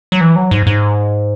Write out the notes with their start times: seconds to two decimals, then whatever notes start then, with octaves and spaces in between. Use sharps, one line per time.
0.12 F#3
0.21 E3
0.36 F#3
0.51 G#2
0.67 G#2